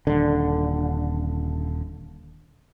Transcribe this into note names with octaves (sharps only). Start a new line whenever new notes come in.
D#1 D3